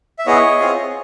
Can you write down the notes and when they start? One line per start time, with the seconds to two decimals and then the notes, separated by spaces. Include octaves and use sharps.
0.19 E5
0.26 B3 E4 G#4 C#5 D#5
0.60 C4 F4 G#4